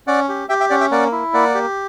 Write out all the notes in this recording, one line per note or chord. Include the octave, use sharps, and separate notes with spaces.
C#4 D5 F#5
G4
G4 E5 G5
E5 G5
C#4 D5 F#5
E5 G5
A#3 D5 F#5
E4
A#3 D5 F#5
G4